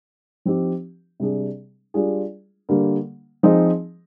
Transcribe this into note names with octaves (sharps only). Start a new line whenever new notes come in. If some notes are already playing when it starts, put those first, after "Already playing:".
F3 C4 D#4 G4
C3 G3 D4 G#4
G3 D4 F4 G#4
D3 G3 A#3
F3 C4 D#4 G#4